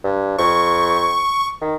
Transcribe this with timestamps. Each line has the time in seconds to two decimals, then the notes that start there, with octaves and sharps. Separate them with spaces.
0.04 G2
0.39 F2 C#6
1.61 D#3